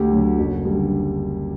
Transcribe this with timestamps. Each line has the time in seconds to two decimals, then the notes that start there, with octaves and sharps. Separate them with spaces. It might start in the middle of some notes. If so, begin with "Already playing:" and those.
Already playing: D2 G4
0.11 D3 F#3
0.38 F#1
0.65 D3 G3